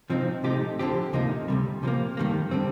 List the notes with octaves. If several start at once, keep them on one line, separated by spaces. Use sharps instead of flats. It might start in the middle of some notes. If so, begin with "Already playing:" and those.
C3 F3 C4 D#4
C3 F3 A3 D#4 G4
D2 D3 F3 C4 G4
D2 C3 F3 A#3 D#4
D2 C3 G3
C3 F3 A#3
F2 D#3 G3 A#3
D3 G3 C4